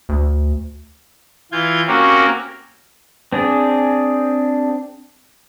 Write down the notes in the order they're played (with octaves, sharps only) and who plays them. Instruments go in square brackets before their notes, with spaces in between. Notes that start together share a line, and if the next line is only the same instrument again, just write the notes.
[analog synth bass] D2
[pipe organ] E3 F4 G6 G#6
A#3 C4 C#4 F#4 G4 A#4
[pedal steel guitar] C4 D4 G#4